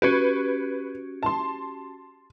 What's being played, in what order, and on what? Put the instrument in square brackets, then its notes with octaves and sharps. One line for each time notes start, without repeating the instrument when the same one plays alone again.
[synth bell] C#4 F#4 G4 [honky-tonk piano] B4
[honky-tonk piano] A5 C6